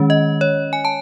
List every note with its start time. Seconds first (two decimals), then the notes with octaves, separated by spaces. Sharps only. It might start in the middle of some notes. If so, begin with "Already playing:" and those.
Already playing: D#3 G#3 C#4
0.10 D#5
0.41 C#5
0.73 G#5
0.85 A5